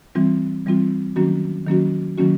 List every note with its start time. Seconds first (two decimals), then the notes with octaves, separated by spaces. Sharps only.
0.15 E3 G3 C4 F4
0.66 E3 G3 C4 F4
1.16 D#3 F#3 A#3 C#4 F#4
1.67 D#3 F#3 A#3 C#4 F#4
2.18 D#3 F#3 A#3 C#4 F#4